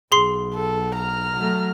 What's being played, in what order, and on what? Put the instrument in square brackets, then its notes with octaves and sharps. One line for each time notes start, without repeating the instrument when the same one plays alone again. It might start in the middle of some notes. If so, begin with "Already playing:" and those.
[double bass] B1 [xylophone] G#4 C6 C7
[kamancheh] A4
A#5 F6
[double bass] F#3 A3